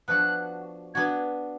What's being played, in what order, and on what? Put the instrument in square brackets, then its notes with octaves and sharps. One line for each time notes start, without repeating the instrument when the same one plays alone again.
[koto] F3 B3 D4 F#4 [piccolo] F#6
[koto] B3 D4 F#4 [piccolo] G#6